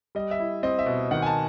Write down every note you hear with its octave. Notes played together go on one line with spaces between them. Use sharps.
G3 D#5
E5
E4
C4 D#5
E5
B2
D#3 F#5
G#5
A5